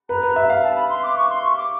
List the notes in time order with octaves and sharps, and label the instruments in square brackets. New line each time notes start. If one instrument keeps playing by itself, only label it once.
[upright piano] B4 [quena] A#5
[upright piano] B4
E5
F5
[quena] A5
B5
C6
D6
C#6
C6
C#6
D6